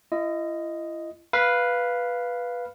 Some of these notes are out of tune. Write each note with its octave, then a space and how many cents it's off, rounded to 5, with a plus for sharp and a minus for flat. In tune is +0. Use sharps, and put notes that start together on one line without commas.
E4 +40 D#5 +0
B4 -5 F5 +0